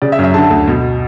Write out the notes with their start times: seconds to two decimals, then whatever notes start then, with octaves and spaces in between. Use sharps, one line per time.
0.02 C#3 D5
0.12 E5
0.19 F#2
0.24 E5
0.34 D3 A5
0.50 D2
0.67 B2